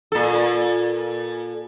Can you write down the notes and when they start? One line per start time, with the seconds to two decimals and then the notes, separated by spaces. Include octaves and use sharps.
0.12 A#2 A4